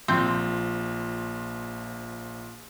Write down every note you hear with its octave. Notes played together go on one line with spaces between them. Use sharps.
A#1 F3 C4